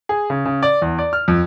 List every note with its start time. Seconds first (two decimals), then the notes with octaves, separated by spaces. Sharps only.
0.09 G#4
0.30 C#3
0.45 C#3
0.63 D5
0.82 E2
0.99 D5
1.13 F6
1.28 F2